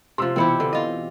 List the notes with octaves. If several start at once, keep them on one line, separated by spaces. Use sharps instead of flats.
C3 F3 C6 E6
B2 E3 C4 E4 G4 C#7
D3
F4 D#5